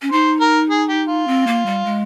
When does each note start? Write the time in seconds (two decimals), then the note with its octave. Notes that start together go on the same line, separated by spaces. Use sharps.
0.02 C#4
0.12 D#4 C5
0.41 A#4
0.70 G#4
0.89 G4
1.08 F4
1.27 C4
1.47 A#3
1.66 G3
1.85 G#3